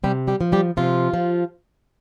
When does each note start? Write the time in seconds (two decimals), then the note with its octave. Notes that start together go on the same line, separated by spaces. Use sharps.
0.04 C3 G3 G4
0.28 G3 G4
0.41 F3
0.52 G3 G4
0.77 C3 F3 F4
1.14 F3